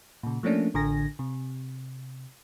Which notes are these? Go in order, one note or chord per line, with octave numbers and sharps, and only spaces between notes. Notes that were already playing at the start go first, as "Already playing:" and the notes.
A#2 C#3
F3 A3 A#3 C#4 D4
A1 D3 G#5 A#6
C3